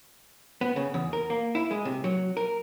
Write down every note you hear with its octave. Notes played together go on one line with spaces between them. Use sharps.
B3
C#3
E2
A#4
A#3
E4
G#3
C3
F#3
A#4